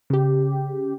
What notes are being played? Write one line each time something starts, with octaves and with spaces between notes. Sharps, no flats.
C#3 G4